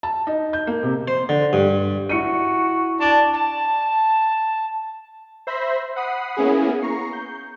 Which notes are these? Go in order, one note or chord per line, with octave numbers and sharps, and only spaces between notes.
A5
D#4
G6
A#3
C3
C5
D3
G2
E4 F#4 C#7 D#7
D4 A5
A5
C5 E5 B5 A#6 C7
F#5 B5 D#6 C7
A#3 B3 C#4 E4 G#4
A#5 C#6 C7
G6